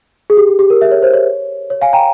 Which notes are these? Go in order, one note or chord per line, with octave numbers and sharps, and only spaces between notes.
G#4
G4
G4
G4
A#4
E5
C#5
C5
C#5
C#5
F5 G#5
G5 A#5